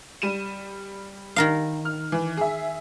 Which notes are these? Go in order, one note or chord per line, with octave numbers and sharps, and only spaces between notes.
G3 D#7 E7
D#3 A#4 F5
F6
E3
G#4 E5